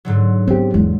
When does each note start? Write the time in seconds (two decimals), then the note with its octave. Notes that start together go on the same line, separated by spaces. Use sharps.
0.05 G#2 D3 F#3
0.48 B3 C4 G4
0.74 E2 G#3